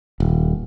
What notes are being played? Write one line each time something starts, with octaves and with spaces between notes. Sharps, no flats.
D#1